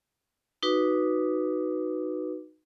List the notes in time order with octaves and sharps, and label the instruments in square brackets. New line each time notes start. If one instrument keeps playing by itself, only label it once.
[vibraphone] D#4 F#4 B4 D6